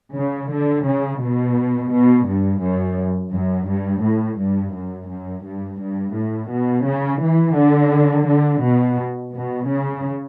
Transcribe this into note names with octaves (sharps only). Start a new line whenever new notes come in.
C#3
D3
C#3
B2
B2
G2
F#2
F#2
G2
A2
G2
F#2
F#2
G2
G2
A2
B2
C#3
E3
D3
D3
B2
B2
C#3